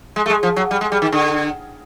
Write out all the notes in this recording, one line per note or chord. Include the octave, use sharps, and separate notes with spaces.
G#3
A3
G#3
F3
F#3
G3
G#3
G3
D#3
D3